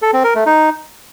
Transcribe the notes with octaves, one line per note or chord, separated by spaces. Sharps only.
A4
C4
A#4
A3
D#4